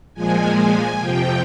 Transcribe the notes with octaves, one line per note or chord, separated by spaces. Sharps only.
A#2 F3 G#3 G#5
G#5
F2 C3 F3 G5